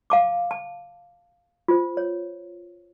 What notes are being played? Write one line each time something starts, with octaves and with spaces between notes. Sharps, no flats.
F5 A5 D6
A5
F4 C5
C#5